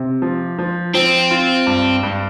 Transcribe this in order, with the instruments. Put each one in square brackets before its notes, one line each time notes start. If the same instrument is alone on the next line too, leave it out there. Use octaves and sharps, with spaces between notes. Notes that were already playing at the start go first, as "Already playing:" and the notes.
Already playing: [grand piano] C3
F3
F3
[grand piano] F3 [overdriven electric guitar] C4
[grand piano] F4
G2
G2